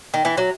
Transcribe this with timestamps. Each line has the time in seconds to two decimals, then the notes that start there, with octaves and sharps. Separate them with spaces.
0.14 D#3
0.25 E3
0.37 F#3